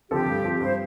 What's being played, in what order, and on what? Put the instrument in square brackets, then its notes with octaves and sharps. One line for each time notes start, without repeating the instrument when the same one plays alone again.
[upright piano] D3 F3 C4 A4 [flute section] G4
[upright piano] G2
F3 C4
[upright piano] G2 [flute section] C5